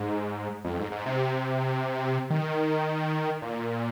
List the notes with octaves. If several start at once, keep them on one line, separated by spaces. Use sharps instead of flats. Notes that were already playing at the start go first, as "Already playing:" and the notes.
Already playing: G#2
F2
G#2
G#2
C3
D#3
A#2